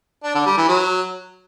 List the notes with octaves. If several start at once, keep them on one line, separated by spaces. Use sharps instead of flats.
D4
D3
G3
E3
F#3